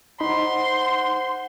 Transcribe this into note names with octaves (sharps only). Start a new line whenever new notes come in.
D#4 C5 F#5 B5 C6